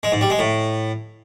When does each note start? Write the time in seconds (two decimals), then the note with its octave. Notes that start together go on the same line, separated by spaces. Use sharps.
0.03 G#3
0.12 G#2
0.21 G3
0.30 G#3
0.39 A2